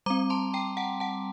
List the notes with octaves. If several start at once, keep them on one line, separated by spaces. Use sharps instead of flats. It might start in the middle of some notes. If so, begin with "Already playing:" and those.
G3 C4 A#5 D6
A5 C6
G5 A#5
F#5 A5
F#5 A5